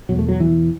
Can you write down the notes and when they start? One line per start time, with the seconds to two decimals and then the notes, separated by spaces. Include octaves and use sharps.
0.09 E2 B2 F#3
0.19 A3
0.29 F#3
0.40 E3